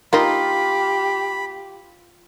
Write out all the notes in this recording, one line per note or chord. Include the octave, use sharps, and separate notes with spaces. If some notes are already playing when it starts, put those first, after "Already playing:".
A#3 D#4 F4 G4 B5